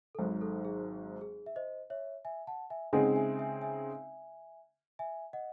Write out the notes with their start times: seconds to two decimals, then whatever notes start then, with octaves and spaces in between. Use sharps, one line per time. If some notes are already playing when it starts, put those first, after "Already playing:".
0.15 A4
0.19 G#1 G#2 F#3 G#4
0.41 A4
0.65 G#4
1.21 G#4
1.46 E5
1.56 C5 D#5
1.90 C#5 E5
2.25 E5 G#5
2.47 F#5 A5
2.70 E5 G#5
2.93 C#3 G#3 C4 D#4 G#4 D#5 F#5
3.16 E5 G#5
3.39 E5 G#5
3.62 E5 G#5
4.99 E5 G#5
5.33 D#5 F#5